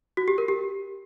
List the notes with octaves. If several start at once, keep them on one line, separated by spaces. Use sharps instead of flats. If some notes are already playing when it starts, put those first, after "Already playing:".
F#4
G4
A#4
G4